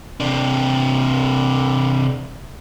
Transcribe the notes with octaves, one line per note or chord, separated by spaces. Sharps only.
C3 D4